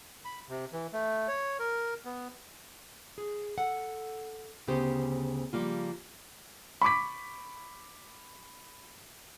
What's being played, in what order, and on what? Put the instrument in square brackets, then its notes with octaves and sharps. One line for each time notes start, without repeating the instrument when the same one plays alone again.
[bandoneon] B5
C3
E3
A3
C#5
A#4
B3
[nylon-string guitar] G#4
A4 F#5
D2 C#3 B3 G4 C5
C#3 F3 G3 A#3 F4
[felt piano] B5 C#6 D6 B6